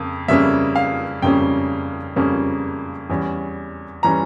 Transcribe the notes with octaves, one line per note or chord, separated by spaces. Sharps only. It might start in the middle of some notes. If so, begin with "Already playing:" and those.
Already playing: F2 C#3 A#3
F2 C#3 G3 A#3 C#4 E5
F5
F2 C#3 G3 A#3 C#4 G5
F2 C#3 G3 A#3 C#4
E2 E3 G3 C#4
E3 G3 C#4 A#5